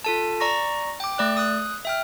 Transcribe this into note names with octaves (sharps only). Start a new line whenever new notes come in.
F4 A4 A5
D5 A#5 C#6 A#6
G5 D6
A3 D5 F#6
D#6 F#6
E5 G5 F6